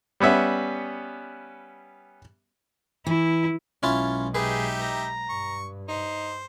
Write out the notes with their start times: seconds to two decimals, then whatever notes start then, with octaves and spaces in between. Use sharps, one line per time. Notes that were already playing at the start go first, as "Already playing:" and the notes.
0.20 G3 B3 C#4 E5
3.06 E3 E4
3.83 B1 G#3 C#4 E4 F4
4.35 D#4 G4 G#4 B4 E5
4.82 A#5
5.29 G2 C#6
5.88 D#4 C5